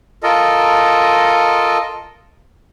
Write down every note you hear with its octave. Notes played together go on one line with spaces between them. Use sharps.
F4 A4 A#4 D#5